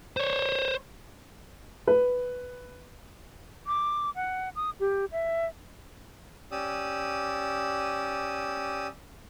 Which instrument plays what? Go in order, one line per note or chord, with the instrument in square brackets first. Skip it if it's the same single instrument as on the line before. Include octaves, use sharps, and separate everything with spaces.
[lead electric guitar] C5 C#5
[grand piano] B4
[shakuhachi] D6
F#5
D#6
G4
E5
[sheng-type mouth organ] C#4 G4 D5 D#6 E6